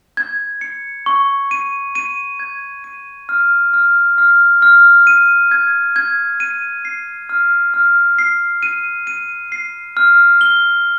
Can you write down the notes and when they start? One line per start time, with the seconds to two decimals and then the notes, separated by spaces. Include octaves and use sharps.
0.17 G#6
0.61 C#7
1.06 C#6
1.51 D#7
1.95 D#7
2.40 G#6
2.84 D#7
3.29 F6
3.74 F6
4.18 F6
4.62 F6
5.07 D#7
5.51 G#6
5.96 G#6
6.40 D#7
6.85 C7
7.29 F6
7.74 F6
8.18 C7
8.63 D#7
9.07 D#7
9.52 C7
9.97 F6
10.41 G7